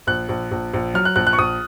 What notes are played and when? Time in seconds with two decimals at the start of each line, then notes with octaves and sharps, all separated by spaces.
0.07 A#1 F#6
0.29 A#1
0.51 A#1
0.73 A#1
0.94 F#3 F6
1.05 F#6
1.16 A#1 F#6
1.27 F#6
1.33 C#6
1.38 A#1 D#6